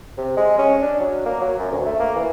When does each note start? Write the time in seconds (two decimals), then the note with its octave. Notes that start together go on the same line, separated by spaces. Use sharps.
0.18 C3
0.37 G#3
0.58 C#4
0.82 D4
1.00 F#3
1.26 A#3
1.41 F#3
1.59 F#2
1.71 D2
1.85 A3
2.00 A#3
2.16 E3